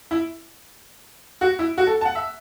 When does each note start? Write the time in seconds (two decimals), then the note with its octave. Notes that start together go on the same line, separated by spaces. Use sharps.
0.11 E4
1.41 F#4
1.59 E4
1.78 F#4
1.87 A4
2.01 A5
2.05 F#5
2.15 E5